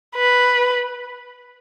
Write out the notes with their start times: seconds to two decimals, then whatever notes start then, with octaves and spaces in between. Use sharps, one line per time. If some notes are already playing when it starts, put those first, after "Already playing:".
0.16 B4